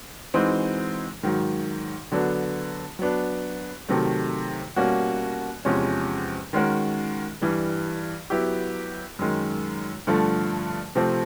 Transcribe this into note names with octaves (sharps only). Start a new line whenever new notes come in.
E3 G#3 C4 D#4 F#4
G#2 D#3 F#3
D3 F#3 B3 D4
F#3 B3 D4
C3 D#3 F#3 A3
B2 G3 A#3 C#4 F#4
E2 C3 F3 G#3 C#4
D#3 G#3 C#4 F#4 A#4
G2 E3 G3
F#3 B3 E4 G4
F#2 D#3 G#3
G2 D3 F3 A3
C3 F3 A3 C4